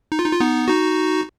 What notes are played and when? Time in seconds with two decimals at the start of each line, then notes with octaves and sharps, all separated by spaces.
0.12 D#4
0.19 F4
0.26 D#4
0.33 F4
0.40 B3 D#4
0.68 D#4 F#4